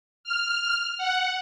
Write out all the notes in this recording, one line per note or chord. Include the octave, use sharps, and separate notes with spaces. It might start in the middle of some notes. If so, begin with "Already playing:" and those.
F6
F#5